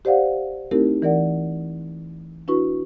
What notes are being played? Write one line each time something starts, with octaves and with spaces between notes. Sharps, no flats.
G4 C5 D5 F5 F#5
A3 C4 D#4 E4 G4 A#4
E3 A#4 D5 F#5
D4 E4 F#4 B4 C#6